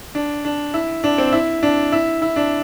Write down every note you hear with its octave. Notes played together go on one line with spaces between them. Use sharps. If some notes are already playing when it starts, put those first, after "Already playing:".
D4
D4
E4
D4
C4
E4
D4
E4
E4
D4